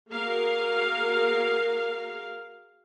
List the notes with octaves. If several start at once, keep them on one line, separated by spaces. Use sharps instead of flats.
A#3 F#4 G#4 A#4 F5